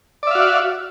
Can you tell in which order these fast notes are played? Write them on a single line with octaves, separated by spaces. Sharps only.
D5 E5 F5 F#4